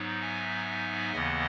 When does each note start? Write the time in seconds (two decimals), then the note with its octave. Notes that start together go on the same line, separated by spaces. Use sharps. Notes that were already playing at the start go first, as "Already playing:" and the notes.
Already playing: G#2 F#3 B3 D#4
0.21 E5 G#5
1.12 D#2 C#3 E3 B3 D#5 F#5